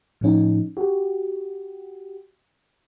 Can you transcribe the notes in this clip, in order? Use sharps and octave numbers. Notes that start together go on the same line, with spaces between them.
A2 F3 C#4 D#4
F#4 G4